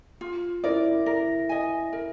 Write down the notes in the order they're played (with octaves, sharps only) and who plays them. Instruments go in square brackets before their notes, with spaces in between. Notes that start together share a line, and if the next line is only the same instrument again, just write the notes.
[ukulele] F4
[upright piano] E4 [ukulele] A#4 D5
[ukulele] A#4
D#5 G#5
A#4